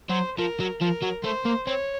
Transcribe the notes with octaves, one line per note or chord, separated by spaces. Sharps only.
F#3 C5
F3 A#4
F#3
F3 A#4
F#3
A3 C5
A#3
C4 C#5